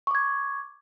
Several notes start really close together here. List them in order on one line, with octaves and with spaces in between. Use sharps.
C#6 D6 G#6